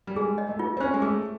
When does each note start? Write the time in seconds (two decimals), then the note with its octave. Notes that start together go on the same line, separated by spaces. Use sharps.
0.07 G3
0.16 G#3 G#4
0.38 D#5
0.49 A3
0.59 F4
0.77 C4
0.80 C#4 C5
0.94 G#3
1.02 A3 G#4